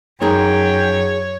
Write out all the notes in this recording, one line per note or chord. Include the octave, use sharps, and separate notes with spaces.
F#2 D#4 G#4 A#4 C#5 G5